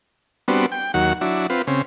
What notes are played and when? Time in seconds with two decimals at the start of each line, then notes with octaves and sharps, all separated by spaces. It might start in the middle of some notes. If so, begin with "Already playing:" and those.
0.48 G3 B3 C4 D4 F#4
0.72 G5
0.94 D#2 F#3 F#5
1.21 F#3 D4 E4
1.50 C4 F4 B4
1.67 C#3 C4